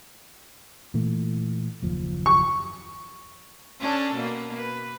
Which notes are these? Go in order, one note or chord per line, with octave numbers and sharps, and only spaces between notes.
A#2 E3 A3
F#1 D#2 F3
C#6
C#4 D4 A4
B2 A#3
B4